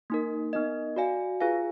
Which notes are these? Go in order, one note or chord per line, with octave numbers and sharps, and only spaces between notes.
A#3 D#4 A#4
B3 D#4 A#4 D#5
F#4 D5 F5 G#5
F4 G#4 B4 F5 G#5